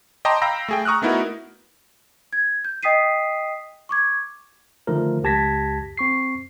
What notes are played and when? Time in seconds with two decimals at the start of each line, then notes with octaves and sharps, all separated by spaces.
0.25 D#5 G5 A5 A#5 C6 D6
0.42 F5 G5 A#5 B5 E6 A#6
0.68 A3 G#4 G5
0.85 A#5 C#6 D#6 F6 F#6
1.02 A3 B3 D#4 E4 F#4 A#4
2.33 G#6
2.65 G6
2.83 D#5 G5 D#6 B6 C7 D#7
3.89 C#6 D6 G#6
4.87 D3 D#3 F3 A3 A#4
5.23 C#2 G4 A5 G#6 A#6 B6
5.97 C4 C#6 C7